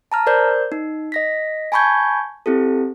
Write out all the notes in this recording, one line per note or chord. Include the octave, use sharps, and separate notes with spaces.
A5 A#5 F6
A#4 C5 D5 G6
D#4
D#5 A#6 B6
G#5 A5 B5 C#6 G6 G#6
C4 E4 G4 A4